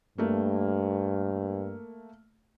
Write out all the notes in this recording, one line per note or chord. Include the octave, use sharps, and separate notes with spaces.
G2 A3 A#3